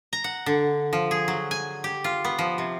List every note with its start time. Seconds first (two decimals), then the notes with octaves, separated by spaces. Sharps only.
0.13 A#5
0.24 F#5
0.46 D3
0.93 F3
1.11 G#4
1.28 F#3
1.51 G#5
1.84 G4
2.04 F4
2.25 B3
2.38 F3
2.58 C3